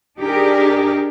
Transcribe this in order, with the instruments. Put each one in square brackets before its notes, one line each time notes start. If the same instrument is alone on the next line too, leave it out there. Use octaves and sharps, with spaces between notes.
[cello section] D4 D#4 G4 G#4 A#4